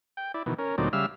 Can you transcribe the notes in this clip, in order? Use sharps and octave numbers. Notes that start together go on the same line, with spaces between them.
G5
E4 D5
B2 D#3 E3
C#4 A#4
D2 A#2 F#3 C4 D#4 D5
C#3 G3 E5 F5 E6 F6